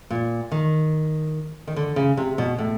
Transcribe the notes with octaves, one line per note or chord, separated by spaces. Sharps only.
A#2
D#3
D#3
D3
C#3
C3
B2
A2